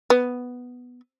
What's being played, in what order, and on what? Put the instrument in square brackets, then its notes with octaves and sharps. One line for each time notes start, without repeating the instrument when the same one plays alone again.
[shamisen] B3